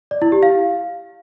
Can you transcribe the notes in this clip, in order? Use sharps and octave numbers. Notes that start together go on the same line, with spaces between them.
D5
E4
G4
F5